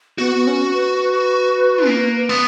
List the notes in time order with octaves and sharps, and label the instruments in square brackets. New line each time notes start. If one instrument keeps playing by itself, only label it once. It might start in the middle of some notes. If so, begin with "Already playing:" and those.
[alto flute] B3 [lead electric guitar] F#4
[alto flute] B3
C#4
B4
B4
[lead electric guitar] A#3
B3